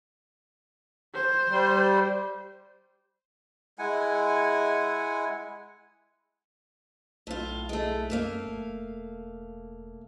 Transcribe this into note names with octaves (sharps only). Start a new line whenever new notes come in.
C5
G3
G#3 E4 F#5 G#5
B1 A2 F4
G#3 A3
F#2 A3 A#3 F5
E1